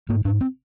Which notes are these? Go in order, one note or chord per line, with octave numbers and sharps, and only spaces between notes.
G#2 A#3
G#2 D4
C4